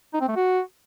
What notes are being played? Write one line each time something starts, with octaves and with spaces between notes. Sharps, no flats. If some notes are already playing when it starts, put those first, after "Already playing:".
D#4
C4
A3
F#4